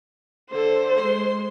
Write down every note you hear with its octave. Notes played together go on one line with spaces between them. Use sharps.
D3 A4 C5
G#3 C6